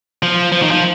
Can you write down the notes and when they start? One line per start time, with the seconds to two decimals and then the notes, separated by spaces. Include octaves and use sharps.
0.23 F3
0.52 F3
0.62 D#3
0.71 F3